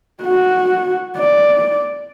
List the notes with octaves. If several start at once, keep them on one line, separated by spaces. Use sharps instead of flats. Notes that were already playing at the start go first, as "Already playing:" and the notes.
F#4
D5